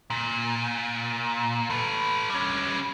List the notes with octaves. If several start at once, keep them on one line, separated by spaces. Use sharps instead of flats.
A#2
A4 B4
G3 C#4